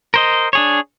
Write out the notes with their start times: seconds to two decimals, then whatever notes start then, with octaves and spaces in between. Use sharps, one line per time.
0.14 A#4 C5 D#5
0.53 D4 G#4 C#5